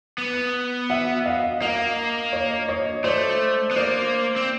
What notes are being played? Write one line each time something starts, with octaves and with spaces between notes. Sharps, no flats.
B3
E5 F#5
D#5 F5
A#3 D#5 F5
C#5 D#5
C#5 D#5
A3 C5 D5
B3
A#3 C5 D5
C4